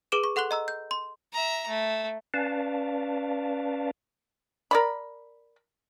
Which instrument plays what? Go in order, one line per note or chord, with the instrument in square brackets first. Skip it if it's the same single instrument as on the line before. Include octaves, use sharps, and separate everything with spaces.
[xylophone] G#4 B4 D6 D7 E7
C#6
A4 F#5 C6 F#6 G7
D#5 A#5 E6
G6
C6
[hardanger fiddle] E5 A#5
A3
[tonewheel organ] C#4 B4 D5 F5 A5
[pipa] A#4 D5 B5